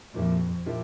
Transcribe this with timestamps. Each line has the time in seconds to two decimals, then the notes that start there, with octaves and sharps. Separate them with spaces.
0.14 F2 A#2 F3 A#3 E4 G4
0.66 A#2 F3 A#3 E4 G4